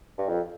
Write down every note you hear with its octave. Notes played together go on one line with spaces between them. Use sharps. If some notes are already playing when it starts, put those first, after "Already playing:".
G2
F2